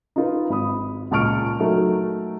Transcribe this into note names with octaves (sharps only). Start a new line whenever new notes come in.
D#4 F4 B4
G#1 B5 D#6
C#2 A#2 A5 C#6 F6 D7
F#3 A3 D#4 A#4